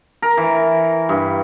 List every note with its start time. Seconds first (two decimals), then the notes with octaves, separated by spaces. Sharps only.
0.22 A#4
0.37 E3
1.09 G2